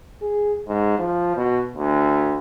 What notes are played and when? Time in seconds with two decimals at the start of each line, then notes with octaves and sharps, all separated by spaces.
0.22 G#4
0.67 G#2
0.99 F3
1.37 B2
1.76 D2